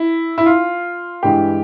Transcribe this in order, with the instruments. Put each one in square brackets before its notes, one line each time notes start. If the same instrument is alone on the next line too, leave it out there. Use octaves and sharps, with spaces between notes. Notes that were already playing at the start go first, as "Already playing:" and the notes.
Already playing: [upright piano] E4
E4
F4
G2 E3 G#3 G4